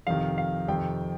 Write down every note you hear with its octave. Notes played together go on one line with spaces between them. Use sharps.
F2 C3 D#3 F5
F5
F2 C3 D#3 G5